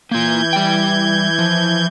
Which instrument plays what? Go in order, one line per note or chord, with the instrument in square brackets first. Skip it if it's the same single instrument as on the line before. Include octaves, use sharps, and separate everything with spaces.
[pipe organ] E3 G6 G#6 [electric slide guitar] A#3 F4
[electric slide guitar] G3 G5
F3